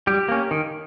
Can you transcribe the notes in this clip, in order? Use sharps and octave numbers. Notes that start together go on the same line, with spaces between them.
G3 G4
A#3 C#4
D#3